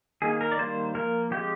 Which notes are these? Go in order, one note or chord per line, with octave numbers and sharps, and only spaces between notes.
D#3 A#3 G#4
A#4
D5
D#3 G3 A#3 C5
F3 A#3 A#4
F3 G#3 C4 G4